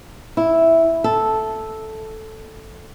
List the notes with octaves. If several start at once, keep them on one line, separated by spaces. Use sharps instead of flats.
E4
A4